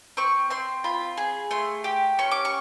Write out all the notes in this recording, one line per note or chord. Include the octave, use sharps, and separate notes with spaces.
C4 C#6
C4 C6
F4 B5
G#4
A3 C6
G4
C#4 C#6
D6
C#6